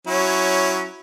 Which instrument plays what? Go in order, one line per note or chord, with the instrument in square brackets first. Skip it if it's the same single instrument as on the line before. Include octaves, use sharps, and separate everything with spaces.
[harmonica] F#3 C#4 E4